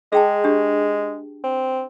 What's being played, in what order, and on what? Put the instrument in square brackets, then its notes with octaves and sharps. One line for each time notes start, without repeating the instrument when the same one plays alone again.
[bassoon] G#3 [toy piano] G#4 G5 A5
[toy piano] D4 G4
[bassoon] C4